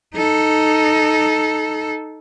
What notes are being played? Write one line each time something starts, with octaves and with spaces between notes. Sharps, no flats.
D#4 A4